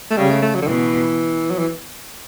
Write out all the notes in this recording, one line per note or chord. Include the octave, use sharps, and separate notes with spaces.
A3
C#3 G3
A3
A3
F#3
D3
B2 E3
F#3
E3